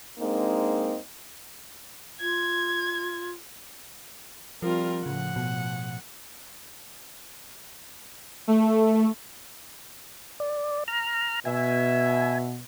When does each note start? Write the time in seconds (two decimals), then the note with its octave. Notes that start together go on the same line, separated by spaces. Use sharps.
0.19 G#3 A#3 C4 D4 D#4
2.21 F4 G#6
4.62 F3 G3 C4 F4 A#4
5.06 A2 C#3 F3 F#5
5.36 B2
8.48 A3
10.40 D5
10.88 A#5 F6
11.45 B2 E5 G#5